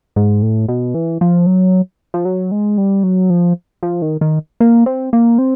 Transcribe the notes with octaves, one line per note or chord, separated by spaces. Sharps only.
G#2
A2
B2
E3
F3
F#3
F3
F#3
G#3
G3
F#3
F3
F3
D#3
D#3
A#3
C4
A#3
C4